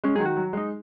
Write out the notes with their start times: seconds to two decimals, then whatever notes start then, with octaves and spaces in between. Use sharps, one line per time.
0.04 G#3 C#4
0.16 F#3 G#4
0.20 D#3
0.26 F#4
0.37 F#3
0.53 G#3 D#4